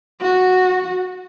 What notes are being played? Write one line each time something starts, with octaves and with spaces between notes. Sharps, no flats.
F#4